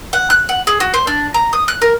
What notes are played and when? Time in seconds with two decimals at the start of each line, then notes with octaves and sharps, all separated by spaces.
0.13 F#5
0.30 F#6
0.49 F#5
0.67 G#4
0.80 F#4
0.94 C5
1.07 D4
1.34 A#5
1.53 D#6
1.68 F#6
1.82 A#4